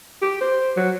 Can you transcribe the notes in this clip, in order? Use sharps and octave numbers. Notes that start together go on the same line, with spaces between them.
G4
C5
F#3